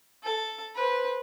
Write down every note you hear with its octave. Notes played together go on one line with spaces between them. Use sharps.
A4
B4 C5